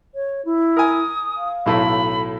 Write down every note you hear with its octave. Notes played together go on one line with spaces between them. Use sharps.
C#5
E4
A#4 G#5 D#6
F5
B1 A2 A3 B5